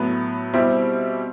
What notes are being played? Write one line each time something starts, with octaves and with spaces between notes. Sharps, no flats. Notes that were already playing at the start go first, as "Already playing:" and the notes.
Already playing: A2 F#3 B3
B2 G3 C4 E4 G4